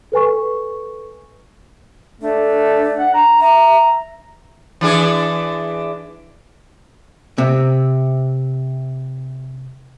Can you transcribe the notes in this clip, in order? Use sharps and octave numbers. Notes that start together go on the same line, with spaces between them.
A4 B4 G#5 C#6
A3 D4
F#5
A#5
E5 A#5
E3 D4 G#4
C3 C4